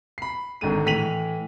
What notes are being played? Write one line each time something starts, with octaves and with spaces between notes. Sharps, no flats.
B5 C7
G#1 G#2 D3 D#7
A2 E3 B6 D#7 F7 F#7